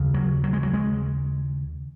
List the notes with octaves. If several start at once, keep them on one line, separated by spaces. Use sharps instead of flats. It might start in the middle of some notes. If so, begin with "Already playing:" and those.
Already playing: D#2 C#3
F#3
F#3
G#3
F#3
G#3